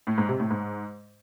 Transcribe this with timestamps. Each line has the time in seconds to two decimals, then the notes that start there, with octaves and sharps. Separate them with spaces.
0.07 A2
0.18 G#2
0.29 C3
0.40 A2
0.51 G#2